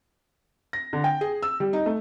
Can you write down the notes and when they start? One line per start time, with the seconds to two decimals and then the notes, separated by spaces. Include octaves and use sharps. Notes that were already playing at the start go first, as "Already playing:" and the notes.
0.73 A#6
0.93 D3
1.04 G5
1.21 G#4
1.43 E6
1.60 G3
1.73 D#4
1.86 A3